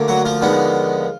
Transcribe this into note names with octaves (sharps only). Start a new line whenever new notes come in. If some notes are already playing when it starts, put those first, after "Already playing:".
Already playing: D2 D3 A#3
F#3 F#4
F3 F4
D#2 D3 G#3 B3